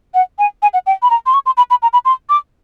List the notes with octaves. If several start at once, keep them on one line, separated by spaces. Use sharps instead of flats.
F#5
G#5
G#5
F#5
G5
B5
A#5
C6
C#6
C6
B5
B5
A#5
B5
C6
D6